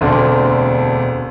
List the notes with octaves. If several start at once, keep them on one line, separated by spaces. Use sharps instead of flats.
E1 D2 C4 D4 A4